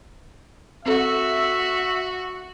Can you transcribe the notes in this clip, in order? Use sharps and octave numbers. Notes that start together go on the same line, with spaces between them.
C4 F#4 A4 E5